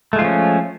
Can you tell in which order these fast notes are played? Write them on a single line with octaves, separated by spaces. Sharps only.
A3 G#3 F4 F3 C#4